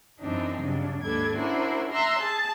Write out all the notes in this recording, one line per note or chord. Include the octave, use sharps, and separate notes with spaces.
F#2 E3 F#3 C4 D4 D#4
G2 C#3 F#3 D4
D#2 G#2 D4 A4 B4 G#6
C#4 D4 E4 F#4 A#4 C5
E5 A#5 C6 E6 F#6
G#4 A5